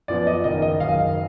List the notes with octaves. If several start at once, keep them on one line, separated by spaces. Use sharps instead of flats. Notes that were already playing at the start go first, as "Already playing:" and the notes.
F#2 F3 B3 D5
D#5
F#1 F#2 D#3 D#5
D#5
F#1 F#2 D#3 F5